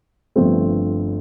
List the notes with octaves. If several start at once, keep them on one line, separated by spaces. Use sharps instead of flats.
G1 G2 F3 A3 C4